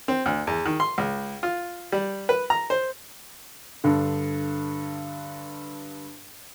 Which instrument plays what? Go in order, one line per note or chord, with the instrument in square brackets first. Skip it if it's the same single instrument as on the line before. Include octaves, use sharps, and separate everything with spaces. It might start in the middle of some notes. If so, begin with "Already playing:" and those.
[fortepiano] C4
D2
E2
D#3
C6
C#2
F4
G3
B4
A#5
C5
[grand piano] G2 D3